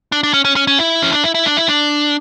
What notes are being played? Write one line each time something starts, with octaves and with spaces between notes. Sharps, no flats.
D4
D4
C#4
C#4
C#4
C#4
E4
C#4
D4
E4
E4
D4
E4
D4